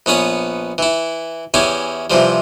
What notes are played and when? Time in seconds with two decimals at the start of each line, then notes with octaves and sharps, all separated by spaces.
0.06 A#1 B3 C#4 B4 D#6
0.78 E3 E4
1.54 E2 C#4 E4 G4 G#5
2.10 C3 E3 F3 G3